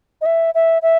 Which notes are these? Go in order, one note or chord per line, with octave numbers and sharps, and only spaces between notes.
D#5
E5
E5
E5